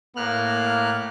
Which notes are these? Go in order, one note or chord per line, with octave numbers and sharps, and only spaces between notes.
A2 A#3 F6 F#6